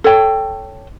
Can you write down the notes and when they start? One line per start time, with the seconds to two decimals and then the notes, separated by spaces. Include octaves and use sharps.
0.04 A4 C#5 G5